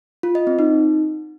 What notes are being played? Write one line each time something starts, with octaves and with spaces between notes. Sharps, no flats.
F4
D#5
C4
D#4